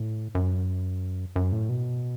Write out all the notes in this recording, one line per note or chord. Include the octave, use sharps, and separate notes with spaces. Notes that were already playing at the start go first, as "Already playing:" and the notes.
Already playing: A2
F#2
F#2
A2
B2